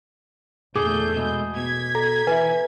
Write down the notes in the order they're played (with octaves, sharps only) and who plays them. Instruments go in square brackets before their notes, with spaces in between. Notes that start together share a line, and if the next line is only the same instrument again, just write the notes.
[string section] E2 A3 G6 [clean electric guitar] A#2 D3 [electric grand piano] G#4 [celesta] D6
[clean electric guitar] B2 G#3 B3
[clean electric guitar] B2 [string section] G#6 B6
[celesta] A4 [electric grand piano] A#5
[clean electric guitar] E3 [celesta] B4 E5 [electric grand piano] G#5